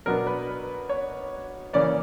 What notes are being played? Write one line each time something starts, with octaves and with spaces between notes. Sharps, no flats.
B2 F#3 B3 D4 A#4
B4
C#5
C#3 E3 A#3 C#4 D5